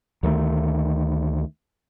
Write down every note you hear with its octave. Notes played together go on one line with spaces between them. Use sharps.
D2 D#3 F#3 A3